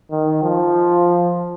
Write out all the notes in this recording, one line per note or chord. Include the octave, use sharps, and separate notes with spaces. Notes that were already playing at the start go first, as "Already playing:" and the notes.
D#3
F3